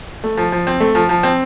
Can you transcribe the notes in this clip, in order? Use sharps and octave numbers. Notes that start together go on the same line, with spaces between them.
A3
F3
F3
C4
A3
F3
F3
C4